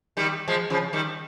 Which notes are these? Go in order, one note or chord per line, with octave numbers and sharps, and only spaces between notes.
D#3 G3
F3 G#3
C#3 F3
D#3 G3